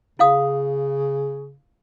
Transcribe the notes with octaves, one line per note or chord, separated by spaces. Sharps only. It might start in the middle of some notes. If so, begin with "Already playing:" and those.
C#3 E4 F5 D#6